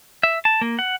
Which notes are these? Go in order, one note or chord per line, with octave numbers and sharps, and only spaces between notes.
E5
A5
A#3
F#5